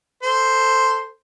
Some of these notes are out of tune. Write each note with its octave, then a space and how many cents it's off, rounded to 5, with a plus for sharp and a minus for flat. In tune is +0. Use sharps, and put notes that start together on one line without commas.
A4 +10 C5 +0